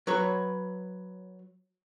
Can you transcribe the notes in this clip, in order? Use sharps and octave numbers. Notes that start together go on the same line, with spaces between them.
F#3 B4 C#5